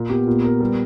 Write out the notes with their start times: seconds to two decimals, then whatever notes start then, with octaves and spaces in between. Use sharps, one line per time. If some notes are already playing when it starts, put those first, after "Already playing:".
Already playing: A#2
0.10 B3 G4
0.27 A#2
0.44 A#4
0.61 G3